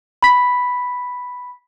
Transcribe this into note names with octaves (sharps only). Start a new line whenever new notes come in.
B5 B6